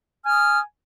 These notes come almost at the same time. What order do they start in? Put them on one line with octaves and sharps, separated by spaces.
G#5 F6 D#6